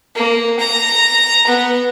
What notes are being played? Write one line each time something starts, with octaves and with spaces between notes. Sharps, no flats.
A#3
A#5
B3